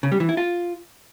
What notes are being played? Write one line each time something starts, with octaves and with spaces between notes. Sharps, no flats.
C#3
G3
E3
E4
F4